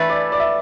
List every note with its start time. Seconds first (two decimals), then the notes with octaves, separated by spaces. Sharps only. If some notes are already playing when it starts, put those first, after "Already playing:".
Already playing: E3 A3 D4 B4 E5
0.10 D5
0.32 D5
0.40 E5